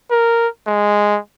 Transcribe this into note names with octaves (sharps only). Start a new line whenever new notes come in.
A#4
G#3